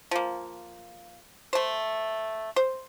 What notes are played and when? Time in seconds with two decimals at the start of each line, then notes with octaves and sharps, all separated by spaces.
0.11 F3 A#3
1.53 A3 C5
2.56 C5